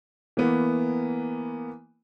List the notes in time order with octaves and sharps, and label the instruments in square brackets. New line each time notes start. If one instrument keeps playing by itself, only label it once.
[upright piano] E3 A#3 B3